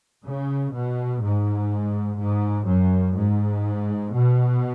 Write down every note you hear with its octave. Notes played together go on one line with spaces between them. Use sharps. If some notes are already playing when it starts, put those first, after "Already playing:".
C#3
B2
G#2
G#2
F#2
G#2
B2